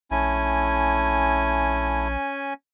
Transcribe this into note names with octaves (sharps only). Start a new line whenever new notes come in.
A#1 A3 C#4 E4 G#5